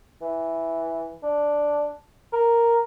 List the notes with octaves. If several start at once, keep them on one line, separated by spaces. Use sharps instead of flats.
E3
D4
A#4